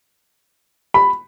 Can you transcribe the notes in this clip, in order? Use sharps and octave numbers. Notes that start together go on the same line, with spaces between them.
B5